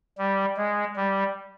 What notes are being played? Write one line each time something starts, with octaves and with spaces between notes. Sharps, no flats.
G3
G#3
G3